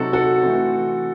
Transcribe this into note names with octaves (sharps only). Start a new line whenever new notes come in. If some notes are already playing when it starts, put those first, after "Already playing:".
Already playing: C3 F#3 C4 D#4 F#4 A4
F#4 A4
E3 A3 C4